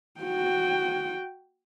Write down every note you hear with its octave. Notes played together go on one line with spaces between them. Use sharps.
F#4 G5